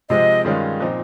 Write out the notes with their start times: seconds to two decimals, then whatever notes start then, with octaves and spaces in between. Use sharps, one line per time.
0.10 C3 F3 G#3 C4 D#5
0.45 G2 D#3 G#3 C#4 F4
0.80 A#2 F3 C4 D#4